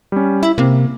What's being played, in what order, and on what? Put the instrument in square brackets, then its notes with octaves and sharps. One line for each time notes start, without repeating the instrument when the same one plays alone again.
[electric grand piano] G3 C#4
[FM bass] E4
[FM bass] C3 [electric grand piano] A#3